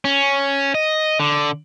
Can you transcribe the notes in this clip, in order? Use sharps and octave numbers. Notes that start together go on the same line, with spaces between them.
C#4
D#5
D3